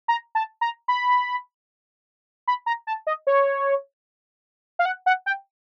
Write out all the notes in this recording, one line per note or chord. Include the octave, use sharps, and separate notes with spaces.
A#5
A5
A#5
B5
B5
A#5
A5
D#5
C#5
F5
F#5
F#5
G5